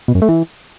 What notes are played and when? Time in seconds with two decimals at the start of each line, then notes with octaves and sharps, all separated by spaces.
0.08 B2
0.15 F#2
0.22 A3
0.29 E3